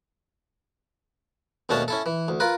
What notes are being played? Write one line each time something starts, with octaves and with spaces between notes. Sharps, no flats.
D#2 B2 A3 C#4 D4 A5
C#4 E4 A4
E3
D2
F4 A#4 B4